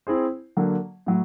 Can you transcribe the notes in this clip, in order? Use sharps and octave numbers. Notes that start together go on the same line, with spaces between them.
C4 E4 G#4 C5
D3 F#3 A#3
A2 F#3